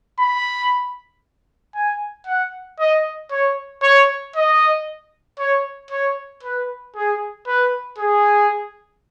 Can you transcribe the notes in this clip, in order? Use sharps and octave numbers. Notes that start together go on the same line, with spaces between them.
B5
G#5
F#5
D#5
C#5
C#5
D#5
C#5
C#5
B4
G#4
B4
G#4